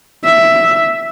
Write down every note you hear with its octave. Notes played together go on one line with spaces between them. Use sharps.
E5